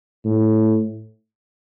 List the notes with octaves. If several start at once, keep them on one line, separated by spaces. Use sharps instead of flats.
A2